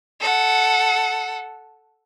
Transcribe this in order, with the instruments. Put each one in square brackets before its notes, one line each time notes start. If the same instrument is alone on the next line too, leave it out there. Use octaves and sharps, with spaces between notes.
[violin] A4 F#5